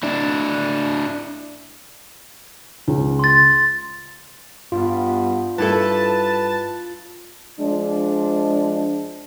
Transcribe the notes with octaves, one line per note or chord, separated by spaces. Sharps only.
D4 E4
C#2
C6 A6
G2 B3 F4
G2 E4 A4 B4 A5
F3 G#3 D4